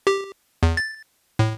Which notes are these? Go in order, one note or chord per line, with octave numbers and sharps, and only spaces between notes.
G4
E2
A6
A2